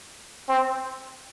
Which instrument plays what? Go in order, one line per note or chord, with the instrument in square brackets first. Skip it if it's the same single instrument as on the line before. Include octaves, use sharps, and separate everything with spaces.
[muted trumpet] C4